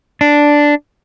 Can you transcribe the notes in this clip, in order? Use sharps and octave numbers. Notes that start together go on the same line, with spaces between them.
D4